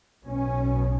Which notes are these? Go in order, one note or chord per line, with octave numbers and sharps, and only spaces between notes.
B1 B2 C#4